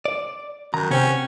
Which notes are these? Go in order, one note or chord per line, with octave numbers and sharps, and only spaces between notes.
D5
F#2 D#3 A#5
C3 C4 C#4 F#5 G5